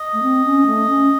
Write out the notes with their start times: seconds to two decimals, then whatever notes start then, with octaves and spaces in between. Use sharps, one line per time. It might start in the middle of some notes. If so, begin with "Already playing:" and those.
Already playing: D#5
0.13 A3
0.22 C4
0.44 C#4
0.66 A3
0.89 C#4